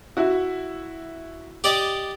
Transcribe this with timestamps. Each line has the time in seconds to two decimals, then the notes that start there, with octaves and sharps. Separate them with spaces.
0.17 E4 F#4
1.64 G4 D5 D#5